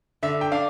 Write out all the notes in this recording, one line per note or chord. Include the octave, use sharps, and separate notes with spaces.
D3 E5
G5
D4 F5